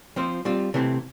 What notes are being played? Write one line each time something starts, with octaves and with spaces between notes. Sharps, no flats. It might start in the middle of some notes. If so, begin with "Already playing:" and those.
F3 C4 F4 C5
G3 C4 F4
C3 E3 A3 C4